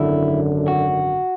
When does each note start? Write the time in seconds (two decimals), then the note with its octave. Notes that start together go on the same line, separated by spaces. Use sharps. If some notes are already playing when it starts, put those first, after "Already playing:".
Already playing: G#1 F#2 D3 E4
0.68 F#4